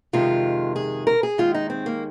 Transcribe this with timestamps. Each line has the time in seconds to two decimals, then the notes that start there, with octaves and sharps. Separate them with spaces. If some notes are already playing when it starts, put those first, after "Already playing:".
0.13 F2 C3 D#3 G#3 F4
0.76 G#4
1.07 A#4
1.23 G#4
1.38 D#2 D#3 G#3 F4
1.54 D#4
1.70 C4
1.86 A#3